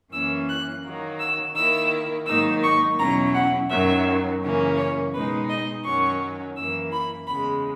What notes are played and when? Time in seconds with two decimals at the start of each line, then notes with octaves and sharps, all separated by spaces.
0.12 F#2 E3 A#3 C#4 E6
0.48 F#6
0.84 D#3 F#3 A#3
1.19 E6
1.55 D#3 A#3 E4 E6
2.26 G#2 D#3 F#3 A#3 D#4 E6
2.63 C#6
2.98 E2 B2 F#3 C#4 E4 A#5
3.34 F#5
3.70 F#2 D#3 F#3 E5
4.42 F#2 C#3 E3 A#3 C#4
4.77 C#5
5.13 B2 G#3 D#4 B4
5.49 D#5
5.84 F#2 D#3 F#3 C#4 C#6
6.55 F#2 E3 A#3 E6
6.92 B5
7.27 E2 C#3 G#3 B5